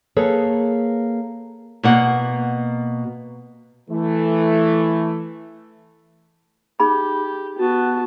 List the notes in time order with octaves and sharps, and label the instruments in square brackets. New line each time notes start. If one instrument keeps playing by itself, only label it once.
[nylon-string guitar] A#3 G#4 A4 B4 C#5
B2 A#3 F#5
[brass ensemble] E3 A3
[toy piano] D#4 G#4 B5 [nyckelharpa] G4
[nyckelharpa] B3 A5 [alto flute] F#4